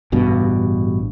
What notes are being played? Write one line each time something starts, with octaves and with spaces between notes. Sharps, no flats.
A1 G2 B2